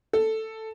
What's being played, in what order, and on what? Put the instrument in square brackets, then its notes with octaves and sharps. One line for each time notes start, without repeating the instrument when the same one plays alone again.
[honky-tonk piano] A4